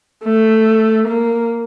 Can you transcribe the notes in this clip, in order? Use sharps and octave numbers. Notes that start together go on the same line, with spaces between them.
A3
A#3